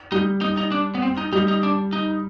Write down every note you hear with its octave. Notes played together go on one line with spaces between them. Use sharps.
G3 D#4
D#4
D#4
D4
B3
C4
D#4
G3 D#4
D#4
D4
D#4